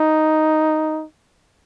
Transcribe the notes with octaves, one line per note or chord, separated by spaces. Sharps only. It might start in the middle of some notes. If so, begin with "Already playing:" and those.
Already playing: D#4